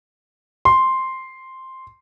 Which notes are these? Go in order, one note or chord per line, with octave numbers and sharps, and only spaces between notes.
C6